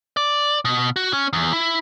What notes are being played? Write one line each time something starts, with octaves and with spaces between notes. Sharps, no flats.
D5
B2
F#4
C#4
E2
E4